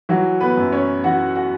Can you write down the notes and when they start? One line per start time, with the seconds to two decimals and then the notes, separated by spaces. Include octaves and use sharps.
0.09 E3 F#3 F#4
0.41 B3 B4
0.57 F#2
0.72 C#4 C#5
1.04 E3 F#4 F#5
1.35 F#4 F#5